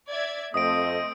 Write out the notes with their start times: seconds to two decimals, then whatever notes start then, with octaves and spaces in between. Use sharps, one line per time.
0.10 D5 E5 G#6
0.54 F2 A3 C4 D#5 D#6 D7